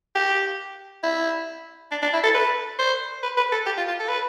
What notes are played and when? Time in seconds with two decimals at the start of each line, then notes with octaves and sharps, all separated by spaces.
0.15 G4
1.04 E4
1.91 D4
2.02 D4
2.13 E4
2.24 A4
2.34 B4
2.79 C5
3.23 B4
3.37 B4
3.52 A4
3.66 G4
3.78 F4
3.88 F4
4.00 A4
4.09 B4